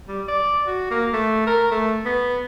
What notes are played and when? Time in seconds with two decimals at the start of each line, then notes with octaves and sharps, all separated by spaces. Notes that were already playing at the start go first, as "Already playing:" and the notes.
0.08 G3
0.28 D5
0.67 F#4
0.91 A#3
1.13 A3
1.47 A#4
1.71 A3
2.05 B3